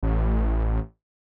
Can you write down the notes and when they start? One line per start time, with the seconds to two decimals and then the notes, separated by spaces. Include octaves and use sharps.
0.03 A1